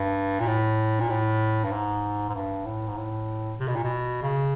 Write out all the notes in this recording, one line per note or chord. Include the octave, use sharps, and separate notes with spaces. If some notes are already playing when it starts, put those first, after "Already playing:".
Already playing: G2
A#2
A2
A#2
A2
G2
G#2
G#2
G2
A2
G#2
A2
C3
B2
A#2
B2
C#3